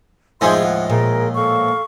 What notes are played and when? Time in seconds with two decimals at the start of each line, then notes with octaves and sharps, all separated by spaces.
0.41 F#2 A2 F3 G#3 D#4 G#4 C6
0.62 D#2 F#5
0.90 A#2 G#4 A#4
1.35 A4 F5 C#6